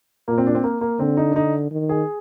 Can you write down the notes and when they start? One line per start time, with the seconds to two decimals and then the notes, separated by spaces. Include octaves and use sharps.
0.28 A#2 A#3
0.38 C4
0.47 D4
0.55 C4
0.64 A#3
0.81 A#3
0.99 D3 C4
1.17 D#4
1.31 D4
1.35 D3 D#4
1.71 D#3
1.89 G#4